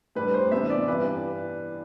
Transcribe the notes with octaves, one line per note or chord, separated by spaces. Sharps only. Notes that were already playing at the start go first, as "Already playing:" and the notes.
A2 G3 D4 B4
C5
C3 E3 B3 D4 E5
D5
G2 E3 G3 D4 B4